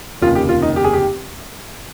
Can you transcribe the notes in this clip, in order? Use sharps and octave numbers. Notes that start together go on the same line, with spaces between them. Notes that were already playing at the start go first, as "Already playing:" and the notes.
F1 D#2 C#3 F4
G4
F4
D#4
G4
G#4
G4